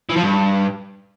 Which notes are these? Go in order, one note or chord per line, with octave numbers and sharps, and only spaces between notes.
E3
F3
G2